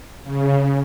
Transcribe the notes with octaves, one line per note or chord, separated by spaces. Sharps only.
C#3